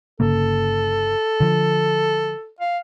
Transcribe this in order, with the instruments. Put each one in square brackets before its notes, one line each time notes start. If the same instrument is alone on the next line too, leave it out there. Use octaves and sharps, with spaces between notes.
[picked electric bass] G1 C#3 A#3 [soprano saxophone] A4
[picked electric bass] D3 F3
[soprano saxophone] F5